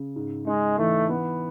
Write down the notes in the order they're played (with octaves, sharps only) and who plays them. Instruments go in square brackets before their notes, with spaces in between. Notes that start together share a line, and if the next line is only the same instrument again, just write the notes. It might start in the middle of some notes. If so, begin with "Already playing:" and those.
Already playing: [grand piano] C#3
G#2
[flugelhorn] G#3 [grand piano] D#4
[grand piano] E3 [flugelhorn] A3
[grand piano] B3